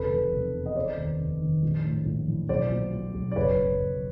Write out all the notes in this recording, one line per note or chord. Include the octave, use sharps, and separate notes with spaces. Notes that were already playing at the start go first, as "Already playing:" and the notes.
Already playing: F1 C#3 A4 B4
E2
F1
B2
D#5
F1 C5 D5
D#2
F1
D#3
A#1
A2
A#1
E3
B1 C5 D5
A#2
A#2
B1
D5
F#1 B4 C#5
F#2
F#1